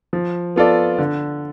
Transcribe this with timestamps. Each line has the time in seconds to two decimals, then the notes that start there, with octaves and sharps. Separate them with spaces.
0.13 F3
0.56 B3 F4 A4 D5
0.98 D3